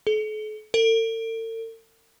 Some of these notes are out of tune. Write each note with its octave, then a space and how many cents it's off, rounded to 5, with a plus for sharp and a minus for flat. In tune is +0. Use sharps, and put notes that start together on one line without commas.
A4 -45
A4 +45